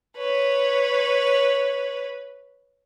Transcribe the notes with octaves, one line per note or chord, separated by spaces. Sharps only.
B4 C#5